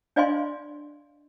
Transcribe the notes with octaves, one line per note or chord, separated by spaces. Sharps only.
D4 D5 D#5 F5 G#5 C6